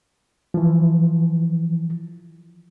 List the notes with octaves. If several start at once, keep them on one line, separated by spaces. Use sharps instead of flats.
E3 F3